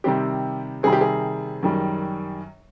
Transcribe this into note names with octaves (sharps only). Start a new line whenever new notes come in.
C3 D#3 G3 C4 G4
C3 D#3 G3 C4 G#4
G4
G#4
F#2 D#3 G3